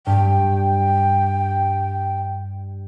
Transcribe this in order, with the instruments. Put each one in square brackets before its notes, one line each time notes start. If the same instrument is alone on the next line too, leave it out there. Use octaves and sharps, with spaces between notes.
[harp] G2 [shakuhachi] G5